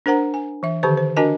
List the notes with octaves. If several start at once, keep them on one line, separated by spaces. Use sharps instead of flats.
D4 A#4 C5 F#5 A#5
G#5
E3 E5
D3 D#3 G4 C5 C#6
C5
D4 F#4 A#4 D#5 G#5 A5